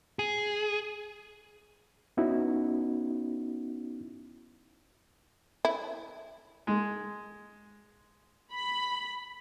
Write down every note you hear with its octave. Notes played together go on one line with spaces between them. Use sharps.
G#4
B3 C#4 D#4 E4 F#4
E4
G#3
B5